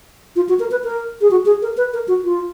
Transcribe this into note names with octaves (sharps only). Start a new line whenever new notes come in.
F4
F#4
A#4
B4
A#4
G#4
F#4
G#4
A#4
B4
A#4
F#4
F4